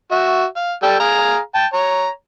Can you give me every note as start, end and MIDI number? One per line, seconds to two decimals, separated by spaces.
0.11 0.45 66
0.11 0.45 76
0.56 0.73 77
0.83 0.96 55
0.83 0.96 69
0.83 0.96 79
1.00 1.38 68
1.00 1.38 77
1.00 1.38 82
1.55 1.66 79
1.55 1.66 81
1.73 2.09 73
1.73 2.09 82